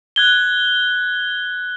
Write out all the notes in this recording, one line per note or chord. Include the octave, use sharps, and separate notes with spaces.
F#6 G#6 G7